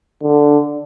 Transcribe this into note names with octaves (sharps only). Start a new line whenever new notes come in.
D3